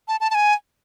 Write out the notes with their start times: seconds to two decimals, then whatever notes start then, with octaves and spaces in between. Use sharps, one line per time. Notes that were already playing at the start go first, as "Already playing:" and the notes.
0.08 A5
0.20 A5
0.31 A5
0.35 G#5